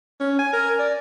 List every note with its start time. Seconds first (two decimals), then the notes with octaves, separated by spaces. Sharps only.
0.20 C#4
0.39 G#5
0.53 A#4
0.79 D5